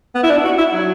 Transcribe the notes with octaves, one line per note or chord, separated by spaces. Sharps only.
B3
E4
D4
F#4
E4
F#3